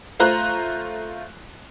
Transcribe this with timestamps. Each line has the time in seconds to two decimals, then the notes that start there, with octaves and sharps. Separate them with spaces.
0.20 A3 F4 C5 A#5 F#6